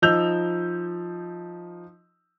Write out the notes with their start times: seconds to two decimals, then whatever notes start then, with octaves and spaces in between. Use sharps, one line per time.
0.02 F3 D#4 E6 G6 F7